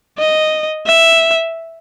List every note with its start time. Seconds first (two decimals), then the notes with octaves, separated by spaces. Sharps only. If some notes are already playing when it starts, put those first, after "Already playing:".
0.18 D#5
0.86 E5